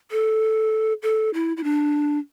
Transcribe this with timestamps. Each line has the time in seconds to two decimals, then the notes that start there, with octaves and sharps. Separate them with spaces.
0.11 A4
1.03 A4
1.34 E4
1.57 E4
1.64 D4